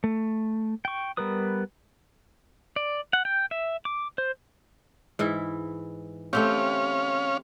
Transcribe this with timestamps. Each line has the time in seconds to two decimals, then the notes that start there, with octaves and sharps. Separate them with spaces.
0.04 A3
0.85 G5 C#6
1.17 G3 B3 A#4 B4 D#6
2.76 D5
3.13 F#5
3.25 G5
3.51 E5
3.85 D6
4.18 C5
5.19 G#2 E3 E4
6.33 A3 C4 C#4 G4 C#5 F5